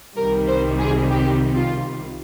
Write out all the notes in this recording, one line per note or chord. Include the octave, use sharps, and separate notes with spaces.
C2 C3 D#3 G3 A#4
C5
G#4
G4
F4